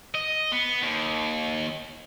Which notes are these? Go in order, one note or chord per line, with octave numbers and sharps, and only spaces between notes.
D#5
B3
D#2